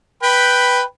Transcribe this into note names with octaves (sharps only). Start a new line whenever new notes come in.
B4 G5 B5